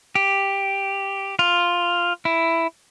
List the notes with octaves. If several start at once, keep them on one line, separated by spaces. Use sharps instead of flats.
G4
F4
E4